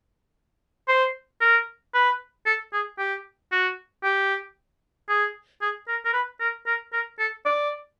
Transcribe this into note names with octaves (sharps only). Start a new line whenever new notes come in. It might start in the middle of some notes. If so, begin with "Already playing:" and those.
C5
A#4
B4
A4
G#4
G4
F#4
G4
G#4
G#4
A#4
A#4
B4
A#4
A#4
A#4
A4
D5